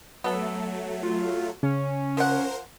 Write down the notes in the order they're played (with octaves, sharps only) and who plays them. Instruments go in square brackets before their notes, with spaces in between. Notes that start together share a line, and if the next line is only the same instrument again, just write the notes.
[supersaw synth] F#3 A3 [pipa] B3 A4
[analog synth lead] F4
[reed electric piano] C#3 [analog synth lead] C#4
[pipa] F3 F#5 [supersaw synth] A#4 C5